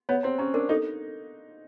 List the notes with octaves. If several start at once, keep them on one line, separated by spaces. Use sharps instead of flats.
B3 C#5
C4 A#5
C#4 A#5
D4 A#4
D#4 A4